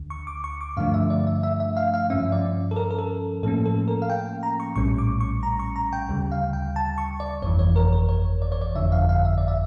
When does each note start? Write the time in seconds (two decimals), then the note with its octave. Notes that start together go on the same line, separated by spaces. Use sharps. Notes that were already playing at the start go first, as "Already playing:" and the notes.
Already playing: D2 D3
0.10 C#6
0.27 D6
0.44 C#6
0.61 D6
0.77 G2 D3 F3 A3 D4 F5
0.94 E5
1.10 D5
1.27 E5
1.43 E5
1.60 E5
1.77 F5
1.94 F5
2.10 G2 F3 C#4 E5
2.32 D5
2.71 A4
2.76 A#4
2.91 A#4
2.99 A4
3.43 A2 F3 A#3 C#4 A4
3.66 A4
3.88 A#4
4.02 F5
4.10 G5
4.43 A#5
4.60 C#6
4.76 A#1 A2 G3 C#4 C#6
4.98 D6
5.21 C#6
5.43 A#5
5.59 C#6
5.76 A#5
5.93 G5
6.09 D2 C#3 G3
6.32 F5
6.53 G5
6.76 A5
6.98 C#6
7.20 D5
7.42 G1 F2 E3 C#5
7.59 C#5
7.76 A#4
7.92 A#4
8.09 C#5
8.42 D5
8.52 C#5
8.62 D5
8.75 G1 F2 D3 F3 E5
8.92 F5
9.09 F5
9.25 E5
9.38 D5
9.48 E5